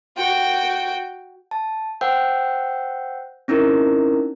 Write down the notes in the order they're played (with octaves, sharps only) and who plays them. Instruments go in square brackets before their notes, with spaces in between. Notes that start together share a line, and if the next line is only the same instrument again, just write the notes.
[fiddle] F#4 G5
[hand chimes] A5
C5 F#5 G5 E6 G6
C4 C#4 D#4 E4 A#4